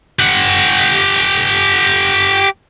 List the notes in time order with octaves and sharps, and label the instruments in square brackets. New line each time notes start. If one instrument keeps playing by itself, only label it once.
[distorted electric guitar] G4 F#5